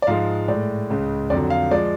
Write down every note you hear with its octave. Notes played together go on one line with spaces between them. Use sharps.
D5
G#2 F3 G#3 F5
A2 G#3 D5
C#2 C#3 G#3
F2 D3 F#3 D5
F5
F3 G#3 D5